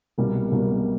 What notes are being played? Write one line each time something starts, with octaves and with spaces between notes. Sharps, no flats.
C2 B2 G3 A#3
C2 B2 G3 A#3